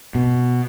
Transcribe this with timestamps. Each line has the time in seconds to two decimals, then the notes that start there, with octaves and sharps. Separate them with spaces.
0.15 B2